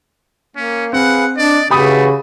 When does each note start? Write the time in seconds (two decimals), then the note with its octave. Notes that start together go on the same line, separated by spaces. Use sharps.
0.56 A#3 C#4
0.93 C4 G#4 B4 F5 F#5
1.37 D4 D5 D#5
1.70 C#3 E3 A3 F#4 G4 B5 D#6